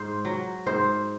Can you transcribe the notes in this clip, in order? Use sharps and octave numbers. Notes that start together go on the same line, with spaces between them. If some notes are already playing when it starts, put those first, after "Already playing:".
Already playing: G#2 C5
F#3
G#2 C5